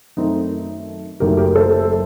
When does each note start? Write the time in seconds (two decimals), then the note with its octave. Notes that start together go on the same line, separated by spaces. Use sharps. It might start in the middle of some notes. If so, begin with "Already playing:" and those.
0.17 F#2 D#3 A3 C4 D#4
1.20 F#1 F#2 D#3 F#3 A3 G4 A#4
1.37 G4 A#4
1.55 A4 C5